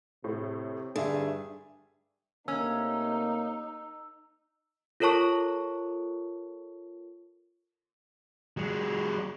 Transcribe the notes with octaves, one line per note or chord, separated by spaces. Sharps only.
A2 C3 A3
G2 D3 A3 G#4 E5
C3 A3 A#3 C#4 D#4 E6
F4 A4 A#4 C#5 A5 C#6
F#3 G#3